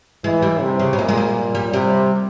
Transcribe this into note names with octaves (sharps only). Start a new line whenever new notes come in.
E3 G#3
G3
C3
C#3
G3
A#2 G#3
G#3
G3
G3
C3 G3